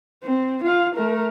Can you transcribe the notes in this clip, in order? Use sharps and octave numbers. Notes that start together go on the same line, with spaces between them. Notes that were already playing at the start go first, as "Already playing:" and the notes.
C4
F4 F5
A3 A#4